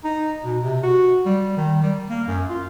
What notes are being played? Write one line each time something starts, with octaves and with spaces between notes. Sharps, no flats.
D#4
B2
C3
F#4
G3
D#3
G3
A#3
F#2
F4